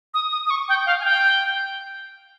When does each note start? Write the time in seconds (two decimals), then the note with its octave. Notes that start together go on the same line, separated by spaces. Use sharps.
0.14 D#6
0.32 D#6
0.47 D#6
0.50 C#6
0.69 G5
0.86 F5
1.00 G#5
1.05 G5